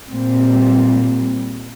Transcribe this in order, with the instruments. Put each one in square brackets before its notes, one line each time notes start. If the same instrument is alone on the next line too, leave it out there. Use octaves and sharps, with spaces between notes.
[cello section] A#2 G3 C4